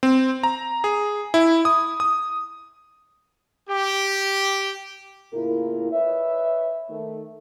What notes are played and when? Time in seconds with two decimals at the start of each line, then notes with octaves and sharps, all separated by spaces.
0.03 C4
0.43 A#5
0.84 G#4
1.34 E4
1.65 D#6
2.00 D#6
3.68 G4
5.33 A2 C#3 A#3 E4 F4 A#4
5.92 B4 C#5 D#5 E5
6.90 D#3 A3